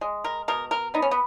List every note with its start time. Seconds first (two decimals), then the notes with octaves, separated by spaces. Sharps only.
0.01 G#3
0.24 A#4
0.48 B2 A#4
0.71 A#4
0.94 B3 D#4
1.02 C#4
1.11 B3